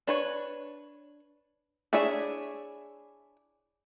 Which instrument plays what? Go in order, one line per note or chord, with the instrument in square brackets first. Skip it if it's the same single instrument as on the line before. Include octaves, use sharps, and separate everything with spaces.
[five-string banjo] D4 B4 C#5
D4 E4 G#4 C#5 E5